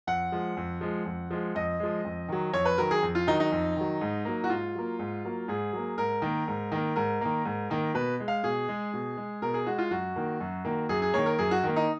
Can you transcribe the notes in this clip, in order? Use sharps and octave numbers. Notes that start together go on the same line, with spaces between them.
F2 F#5
F3 G#3
F2
F3 G#3
F2
F3 G#3
F2 D#5
F3 G#3
F2
D#3 F#3
F2 C#5
B4
D#3 F#3 A#4
G#4
F2
F4
D#3 F#3 D#4
D#4
F2
D#3 F#3
G#2
F#3 A#3
F#4
G#2 F4
F#3 A#3
G#2
F#3 A#3
G#2 G#4
F#3 A#3
G#2 A#4
D#3 A#3
G#2
D#3 A#3
G#2 A#4
D#3 A#3
G#2
D#3 A#3
B2 B4
G#3
F5
B2 G#4
G#3
B2
G#3
B2 A#4
G#4
G#3 F#4
F4
F#2 F#4
D#3 A#3
F#2
D#3 A#3
F#2 G#4
G#4
D#3 A#3 C#5
A#4
F#2 G#4
F#4
D#3 A#3
D#4